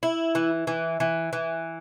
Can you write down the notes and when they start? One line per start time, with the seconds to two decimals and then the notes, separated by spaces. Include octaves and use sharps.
0.03 E4
0.35 E3
0.67 E3
1.00 E3
1.33 E3